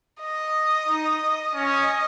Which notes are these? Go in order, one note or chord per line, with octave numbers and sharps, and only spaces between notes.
D#5
D#4
C#4 D#5